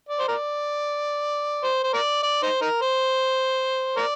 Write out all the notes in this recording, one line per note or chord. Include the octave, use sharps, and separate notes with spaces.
D5
C5
A#4 D5
C5
C5
A#4 D5
D5
D#4 C5
D#4 A#4
C5
A#4 D5